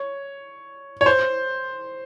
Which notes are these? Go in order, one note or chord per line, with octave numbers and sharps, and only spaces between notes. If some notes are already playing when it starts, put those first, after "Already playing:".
Already playing: C#5
C#5
C5